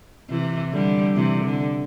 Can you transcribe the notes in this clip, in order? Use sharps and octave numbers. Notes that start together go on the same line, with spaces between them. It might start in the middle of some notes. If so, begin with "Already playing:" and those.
C3 E3
D3 G3
C3 E3
D3